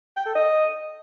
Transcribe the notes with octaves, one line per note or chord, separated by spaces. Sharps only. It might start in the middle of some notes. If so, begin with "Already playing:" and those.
G5
A4
D#5